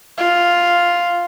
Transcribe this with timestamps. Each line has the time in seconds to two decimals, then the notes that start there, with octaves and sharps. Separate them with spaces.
0.18 F4